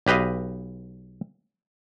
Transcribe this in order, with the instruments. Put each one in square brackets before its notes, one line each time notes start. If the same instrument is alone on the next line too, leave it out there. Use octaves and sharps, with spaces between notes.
[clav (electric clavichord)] B1 G4 B4 D#5 F5